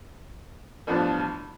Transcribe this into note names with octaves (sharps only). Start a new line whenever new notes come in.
A1 G2 F3 B3 D4